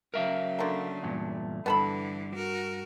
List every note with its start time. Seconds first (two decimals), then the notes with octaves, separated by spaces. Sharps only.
0.14 C#3 F#3 A#4 E5 F5
0.59 D3 A3 A#3
1.03 E2 G2 A#2
1.66 G2 D3 E3 B3 A4 B5
2.35 F#4 A#4